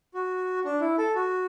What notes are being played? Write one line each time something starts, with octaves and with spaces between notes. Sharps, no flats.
F#4
D4
E4
A4
F#4